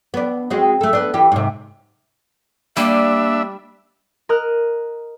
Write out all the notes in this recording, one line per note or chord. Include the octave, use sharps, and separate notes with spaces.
B3 D4
G#3 C4 F#4
A3 A4
B3 D4
E3 G4
G#2 C3
G3 A#3 D4 E5
A#4 D#5 D#6 F6 F#6